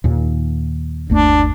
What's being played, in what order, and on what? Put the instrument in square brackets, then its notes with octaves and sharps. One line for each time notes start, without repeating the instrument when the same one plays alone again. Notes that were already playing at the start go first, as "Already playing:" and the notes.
[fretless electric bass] D#2 A#2 D#3
[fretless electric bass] G1 D#2 A3 [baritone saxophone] D4